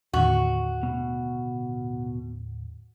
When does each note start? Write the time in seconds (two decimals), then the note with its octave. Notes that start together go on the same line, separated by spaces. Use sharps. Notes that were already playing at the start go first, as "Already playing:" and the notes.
0.13 D#2 A2 D3 F#4
0.83 B2